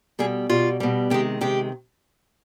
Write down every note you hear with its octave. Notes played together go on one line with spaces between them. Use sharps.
B2 G3 G#4
B2 G3 F4
B2 G3
C3 D#3 G#3 G4
C3 D#3 G#3 G4